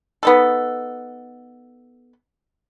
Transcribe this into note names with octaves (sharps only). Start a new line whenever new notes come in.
B3 D#4 A4